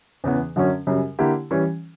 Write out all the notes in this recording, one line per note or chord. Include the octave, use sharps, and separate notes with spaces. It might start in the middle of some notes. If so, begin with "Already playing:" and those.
E2 C#3 E3 B3
F#2 D3 F#3 C#4
F#2 C#3 G3
D3 A#3 E4 G4
E3 G3 C#4